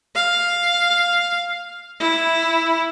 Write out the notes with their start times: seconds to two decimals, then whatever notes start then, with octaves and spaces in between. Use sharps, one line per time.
0.15 F5
2.00 E4